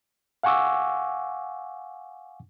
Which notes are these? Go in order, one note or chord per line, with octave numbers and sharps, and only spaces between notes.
F5 F#5 G#5 C#6 D6 E6